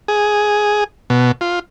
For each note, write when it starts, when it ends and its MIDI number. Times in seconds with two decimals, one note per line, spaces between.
0.08 0.84 68
1.10 1.32 47
1.41 1.59 65